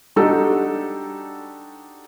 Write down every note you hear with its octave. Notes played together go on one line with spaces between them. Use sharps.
G3 D4 D#4 F#4 G4 A4